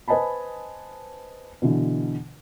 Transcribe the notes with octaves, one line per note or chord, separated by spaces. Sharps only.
B4 C5 D#5 G#5 A5 B5
B2 D3 E3